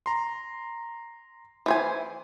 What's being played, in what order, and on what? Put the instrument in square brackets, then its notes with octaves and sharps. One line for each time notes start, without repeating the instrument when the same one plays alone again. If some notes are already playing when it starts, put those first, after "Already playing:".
[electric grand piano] A#5 C6
[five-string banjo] E3 C5 G#5